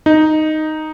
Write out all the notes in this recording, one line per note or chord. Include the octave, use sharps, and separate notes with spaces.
D#4